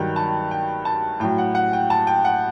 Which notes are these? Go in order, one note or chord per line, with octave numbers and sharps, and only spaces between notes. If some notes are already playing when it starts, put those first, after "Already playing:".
Already playing: G2 D#3 F#3 G5
A5
G5
A5
A2 F#3 G5
F#5
F#5
G5
A5
G5
F#5